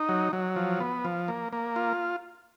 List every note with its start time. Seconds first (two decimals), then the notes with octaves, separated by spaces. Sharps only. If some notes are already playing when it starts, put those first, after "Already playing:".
Already playing: D#4
0.09 F#3
0.33 F#3
0.56 F3
0.80 B3
1.05 F3
1.28 A#3
1.53 A#3
1.76 F4